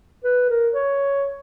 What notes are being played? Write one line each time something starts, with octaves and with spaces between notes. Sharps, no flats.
B4
A#4
C#5